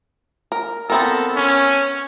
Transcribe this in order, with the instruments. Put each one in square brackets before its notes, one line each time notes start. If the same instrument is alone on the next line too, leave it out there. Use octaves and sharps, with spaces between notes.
[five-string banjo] A#4
[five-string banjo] B3 C4 A#4 [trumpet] A4
[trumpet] C#4